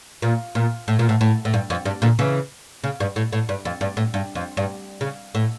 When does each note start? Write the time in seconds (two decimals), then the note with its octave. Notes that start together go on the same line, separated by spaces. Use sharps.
0.22 A#2
0.55 A#2
0.88 A2
0.99 A#2
1.09 A2
1.21 A2
1.45 A2
1.54 G2
1.70 F2
1.85 G2
2.02 A#2 D3
2.19 C#3 E3
2.84 C#3
3.00 G2
3.16 A2
3.33 A2
3.49 G2
3.65 F2
3.81 G2
3.97 A2
4.14 G2
4.35 F2
4.57 G2
5.01 C#3
5.35 A2